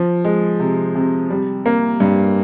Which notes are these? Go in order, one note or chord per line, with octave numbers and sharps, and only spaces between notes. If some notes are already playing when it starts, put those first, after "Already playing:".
Already playing: F3
G#3
C3
C3
G3
A#3
G2